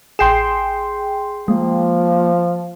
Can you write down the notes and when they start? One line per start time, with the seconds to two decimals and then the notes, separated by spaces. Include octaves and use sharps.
0.19 A1 G#4 G5 C6 C7 E7
1.48 F3 G#3 A#3